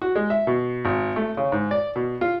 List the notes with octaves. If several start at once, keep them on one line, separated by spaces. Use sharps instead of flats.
F#4
G#3
E5
B2
G#1
A3
C#3
G#2
D5
B2
F4